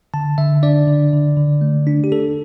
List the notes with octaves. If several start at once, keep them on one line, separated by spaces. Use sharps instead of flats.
D3 A5
D3 E5
D4 D5
D3
D3
D3
A3
D4
G4
D4 A4